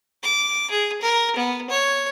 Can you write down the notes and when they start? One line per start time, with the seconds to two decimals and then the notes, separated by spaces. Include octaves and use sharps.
0.23 D6
0.71 G#4
1.01 A#4
1.36 B3
1.70 C#5